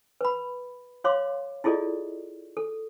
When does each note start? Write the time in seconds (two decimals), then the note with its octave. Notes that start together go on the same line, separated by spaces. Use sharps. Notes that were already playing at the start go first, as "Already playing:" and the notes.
0.21 B4 B5
1.04 F#4 C#5 F5 C6 D6
1.64 E4 F4 G#4 A4 D5 D#5
2.57 A4